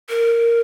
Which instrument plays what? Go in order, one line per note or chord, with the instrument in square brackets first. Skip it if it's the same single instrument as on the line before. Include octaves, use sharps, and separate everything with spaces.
[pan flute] A#4